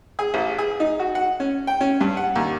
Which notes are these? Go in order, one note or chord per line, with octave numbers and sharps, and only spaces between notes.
G#4
A1
G#4
D#4
F#4
F#5
C#4
G5
C#4
G2
F#5
D#2